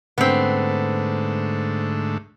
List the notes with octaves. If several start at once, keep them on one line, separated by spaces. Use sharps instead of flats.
G#2 D3 A3 B3 C4